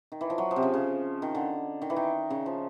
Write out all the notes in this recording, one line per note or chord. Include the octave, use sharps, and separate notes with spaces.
D#3
E3
F3
F#3
F3
C3
C#3
C#3
D#3
D3
D#3
E3
D#3
C#3
F3